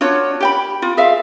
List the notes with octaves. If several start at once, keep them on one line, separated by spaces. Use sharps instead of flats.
D4 F4 F#4 C#5
G4 G5 B5
F4
G#4 E5 F5